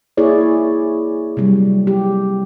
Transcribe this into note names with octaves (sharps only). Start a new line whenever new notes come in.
A#3 E4 G#4 C#5 D5
C3 F#3 G3
G4